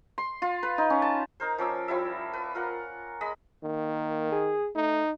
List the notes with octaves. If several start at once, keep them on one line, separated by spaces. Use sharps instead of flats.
C6
F4
B4
D#4
C#4
A5
D#4 A#4 C5
F3 C#4 D6 E6
F3 G3 E4 E5
B4
F4 A#4 F#5
G#3 D#5 B5
D#3 A#3
G#4
A3 D#4